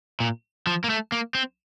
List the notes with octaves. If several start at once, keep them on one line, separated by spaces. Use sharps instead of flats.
A#2
F3
A#3
A3
A#3
C4